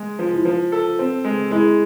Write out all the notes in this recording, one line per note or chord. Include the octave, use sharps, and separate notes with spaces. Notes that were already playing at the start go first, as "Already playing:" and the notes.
Already playing: G#3
F3
E4
F3 F4
A4
C4
G#3
G#3 E4 G#4